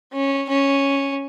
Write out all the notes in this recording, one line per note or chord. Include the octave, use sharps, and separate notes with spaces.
C#4
C#4